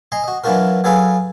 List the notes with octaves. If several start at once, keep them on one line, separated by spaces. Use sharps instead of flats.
D#5 G#5 A#5 C6
F#4 D#5
E3 F#3 D4 F4 F#4 A#4
F#3 G#4 A4 B4 F5 G#5